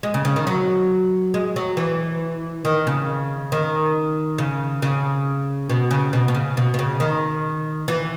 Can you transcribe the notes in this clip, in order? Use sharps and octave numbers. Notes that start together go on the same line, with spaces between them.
G#3
C#3
C#3
D#3
F#3
G#3
F#3
E3
D#3
C#3
D#3
C#3
C#3
B2
C#3
B2
B2
C#3
B2
B2
C#3
D#3
E3